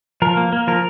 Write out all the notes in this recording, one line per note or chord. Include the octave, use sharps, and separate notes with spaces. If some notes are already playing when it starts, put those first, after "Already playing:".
F3 A#4
A#3
A#3
F3 A#4